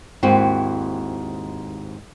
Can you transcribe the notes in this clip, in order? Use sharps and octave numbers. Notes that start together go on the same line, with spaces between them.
D#2 G#2 C4 E4 F#4